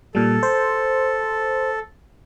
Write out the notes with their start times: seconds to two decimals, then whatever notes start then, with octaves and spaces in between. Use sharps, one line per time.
0.15 A#2 G3 A4
0.43 C5